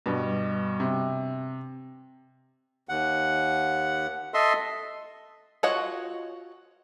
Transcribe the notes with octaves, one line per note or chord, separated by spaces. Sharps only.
G2 B2
C3
D#2 F#5
A4 D#5 E5 C6
F4 F#4 C#5 D#5 F#5